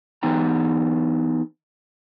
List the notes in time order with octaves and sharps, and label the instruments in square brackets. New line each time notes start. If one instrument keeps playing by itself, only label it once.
[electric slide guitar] E3 B3 D#4 G5 A#5